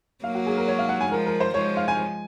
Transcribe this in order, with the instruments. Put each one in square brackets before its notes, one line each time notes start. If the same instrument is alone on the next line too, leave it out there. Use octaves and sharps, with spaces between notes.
[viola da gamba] F#3 A#3 [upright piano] F5
[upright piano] F#4
G#4
A#4
C#5
F5
F#5
G#5
[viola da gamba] F3 G#3 [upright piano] A#4
[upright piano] A#4
C5
[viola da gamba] F3 G#3 [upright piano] C#5
[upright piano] F5
G#5